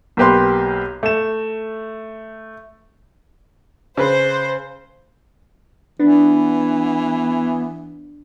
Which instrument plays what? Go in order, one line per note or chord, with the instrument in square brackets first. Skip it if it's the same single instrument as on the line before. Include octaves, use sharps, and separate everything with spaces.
[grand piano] B1 A#3 G4 B4 C6
A3 E7
[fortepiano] C#3 B4 [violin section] C5
[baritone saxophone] E3 [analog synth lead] B3 [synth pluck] D4